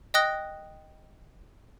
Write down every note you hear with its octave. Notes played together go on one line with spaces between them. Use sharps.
D#5 G5 D#6 F#6 A#6 G7